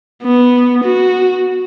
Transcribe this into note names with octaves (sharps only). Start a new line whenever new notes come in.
B3
F#4